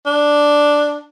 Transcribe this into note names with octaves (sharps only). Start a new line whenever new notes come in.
D4